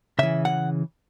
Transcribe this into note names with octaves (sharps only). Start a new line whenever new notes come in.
C#3 E3 E5
F#5